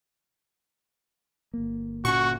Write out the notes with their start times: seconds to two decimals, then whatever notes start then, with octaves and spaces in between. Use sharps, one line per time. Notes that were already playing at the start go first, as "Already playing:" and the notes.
1.54 G1 A#3
2.05 A#2 C#4 F#4 C#6